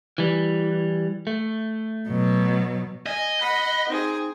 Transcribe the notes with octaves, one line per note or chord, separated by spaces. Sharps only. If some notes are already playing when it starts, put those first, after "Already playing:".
E3 G3
A3
B2 F#3
D#5 G#5
F#5 B5
C4 D#4 G#4